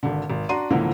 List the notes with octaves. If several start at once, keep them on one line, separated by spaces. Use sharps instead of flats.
G#1 D3
G#1
D4 F#4 A#5 C6 D#7
C#2 G#2 D3 E3 F3 A#3